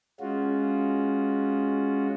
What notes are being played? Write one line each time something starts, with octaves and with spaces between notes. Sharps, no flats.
G#3 C#4 F4 F#4